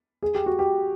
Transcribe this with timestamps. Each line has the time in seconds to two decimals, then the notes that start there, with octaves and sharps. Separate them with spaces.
0.23 G#4
0.35 G4
0.46 F#4
0.59 G4